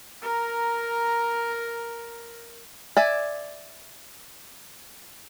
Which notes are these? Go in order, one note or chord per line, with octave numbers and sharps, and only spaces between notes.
A#4 A#5
D5 E5 G#5